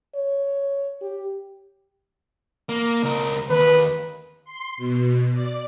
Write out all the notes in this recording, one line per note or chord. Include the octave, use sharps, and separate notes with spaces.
C#5
G4
A#3
C#2 A#4
D#2 B4
C6
B2
D5